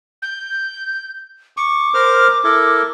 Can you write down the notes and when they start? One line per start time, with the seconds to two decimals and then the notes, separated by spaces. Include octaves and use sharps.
0.22 G6
1.57 C#6 D6
1.94 A#4 C5 F6
2.44 E4 A4 A#4